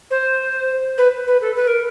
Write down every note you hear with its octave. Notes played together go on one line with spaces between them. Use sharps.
C5
B4
B4
A4
B4
A#4